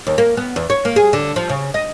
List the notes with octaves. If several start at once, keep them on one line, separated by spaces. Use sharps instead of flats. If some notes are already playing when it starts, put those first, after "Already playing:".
D#2
A#3
B3
E2
C#5
A#3
G#4
D3
F3
C#3
D#5